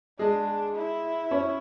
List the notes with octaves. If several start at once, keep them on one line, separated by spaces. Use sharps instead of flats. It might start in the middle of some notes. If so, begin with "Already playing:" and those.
G#3 D4 G#4
E4
C#4 C#5